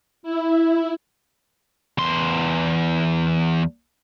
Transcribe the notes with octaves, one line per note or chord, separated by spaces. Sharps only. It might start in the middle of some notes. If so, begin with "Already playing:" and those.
E4
E2 C6